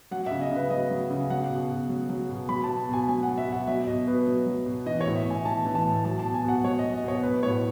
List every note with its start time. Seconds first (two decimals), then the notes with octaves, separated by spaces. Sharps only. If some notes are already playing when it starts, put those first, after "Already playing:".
0.11 F#3 F#5
0.26 C#3 E5
0.41 D#5
0.51 C#3 B4
0.70 F#3 D#5
0.90 F#3
1.11 C#3
1.30 F#3 F#5
1.50 B2
1.70 B2
1.89 F#3
2.09 F#3
2.29 B2
2.49 F#3 B5
2.64 B2 A5
2.89 B2 G#5
3.08 F#3 G#5
3.23 F#3 F#5
3.38 E5
3.48 B2 F#5
3.67 F#3 E5
3.87 B2 D#5
4.07 B2 B4
4.27 F#3
4.46 F#3
4.66 B2
4.86 E3 D#5
5.01 C#5
5.06 A2
5.15 E5
5.26 A2 G#5
5.45 E3 A5
5.65 E3
5.75 A5
5.85 A2
6.05 F#3 A5
6.19 B2 A5
6.34 G#5
6.44 B2 F#5
6.64 F#3 C#5
6.79 D#5
6.84 F#3
6.94 D#5
7.04 B2 C#5
7.23 F#3 B4
7.43 A2 C#5